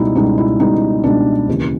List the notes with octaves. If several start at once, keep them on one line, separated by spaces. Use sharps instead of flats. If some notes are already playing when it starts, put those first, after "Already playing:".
Already playing: C#2 B2 G3 D#4 E4
C#2 B2 G3 D#4
E4
C#2 B2 G3 D#4
C#2 B2 G3 D4
D#2 C#3 E3